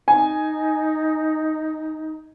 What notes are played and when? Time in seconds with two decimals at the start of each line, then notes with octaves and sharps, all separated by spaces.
0.08 D#4 G#5